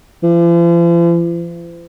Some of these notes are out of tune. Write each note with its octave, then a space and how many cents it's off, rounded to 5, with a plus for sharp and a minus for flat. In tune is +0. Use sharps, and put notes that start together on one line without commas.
F3 -45